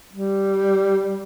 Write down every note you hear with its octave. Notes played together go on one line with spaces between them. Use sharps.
G3